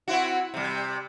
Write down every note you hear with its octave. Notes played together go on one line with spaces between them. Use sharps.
C4 E4 F#4
C3 G3